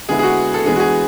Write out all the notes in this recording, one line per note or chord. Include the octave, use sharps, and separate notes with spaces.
D3 G#3 B3 E4 G#4
G#4
F#4
A4
E3 G#3 B3 D4 G#4
F#4
G#4